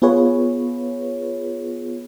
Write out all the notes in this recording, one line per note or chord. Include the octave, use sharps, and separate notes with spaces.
B3 F4 G#4 B4 C#5